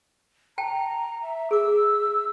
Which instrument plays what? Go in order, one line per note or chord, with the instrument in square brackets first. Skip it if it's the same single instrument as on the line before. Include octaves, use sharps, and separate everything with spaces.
[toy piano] G5 A5 [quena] A#5
[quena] E5
[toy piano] G#4 D6 [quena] E6